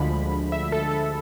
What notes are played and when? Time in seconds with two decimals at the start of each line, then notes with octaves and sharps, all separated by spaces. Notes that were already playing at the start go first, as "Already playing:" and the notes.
Already playing: D2 D3 F3 G#3 B5
0.52 E5
0.72 A4
0.92 A4